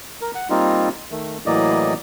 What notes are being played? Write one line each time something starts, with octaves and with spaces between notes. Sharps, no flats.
A#4
F#5
G3 A#3 C4 D#4 F4
D#3 A3
A2 E3 F#3 A#3 D5 D#5